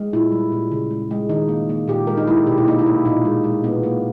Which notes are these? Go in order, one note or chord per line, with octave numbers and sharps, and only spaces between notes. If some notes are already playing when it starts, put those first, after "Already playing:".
Already playing: G#3
A#2 E4
G3
A#2
C#3
G#3
G#3
D#3 D#4
A#3
A#3
A#2 G4
G#3 A#4
D#4
G#3 E4
B2 G4
E4
A#3 D#4
E4
A#3
A#2 D#4
G#3
G#3
A#2 B3
A#3